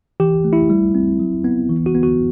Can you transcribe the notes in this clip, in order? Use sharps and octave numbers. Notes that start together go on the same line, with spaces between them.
E3 G4
A3
E4
G3
C4
F#3
B3
E3
F#4
B3
F#4